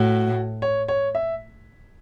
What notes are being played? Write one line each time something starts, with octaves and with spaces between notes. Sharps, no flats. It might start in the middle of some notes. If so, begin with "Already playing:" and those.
Already playing: A2 F#4
C#5
C#5
E5